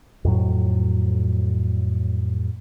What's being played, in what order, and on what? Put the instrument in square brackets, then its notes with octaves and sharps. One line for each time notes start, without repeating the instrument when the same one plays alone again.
[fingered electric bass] F2 A2 F#3